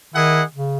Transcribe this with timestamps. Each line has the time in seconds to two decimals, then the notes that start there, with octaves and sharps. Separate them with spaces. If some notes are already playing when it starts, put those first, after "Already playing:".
0.14 D#3 E4 G#4 D#5 F#5
0.55 C#3